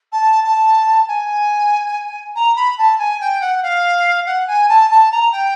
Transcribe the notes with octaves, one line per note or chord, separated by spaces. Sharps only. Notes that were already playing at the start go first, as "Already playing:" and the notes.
A5
A5
G#5
A#5
B5
A5
G#5
G5
F#5
F5
F#5
G#5
A5
A5
A#5
G5